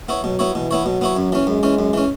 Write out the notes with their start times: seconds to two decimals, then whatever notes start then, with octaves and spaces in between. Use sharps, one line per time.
0.08 B3 E4 C#5
0.23 B2 F#3
0.39 B3 E4 C#5
0.54 B2 E3
0.71 B3 E4 C#5
0.85 B2 F#3
1.01 B3 E4 C#5
1.17 F#2
1.32 E3 C#4
1.47 F#2 G#3
1.63 E3 C#4
1.79 F#2
1.93 E3 C#4